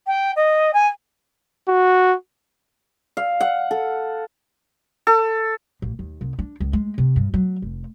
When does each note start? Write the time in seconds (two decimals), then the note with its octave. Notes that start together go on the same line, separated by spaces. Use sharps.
0.07 G5
0.36 D#5
0.74 G#5
1.69 F#4
3.17 F5
3.40 F#5
3.71 A4
5.07 A4
5.82 A1
5.99 D#2
6.21 C2
6.39 D4
6.60 C#2
6.73 G#3
6.98 C3
7.16 G2
7.34 F#3
7.62 F1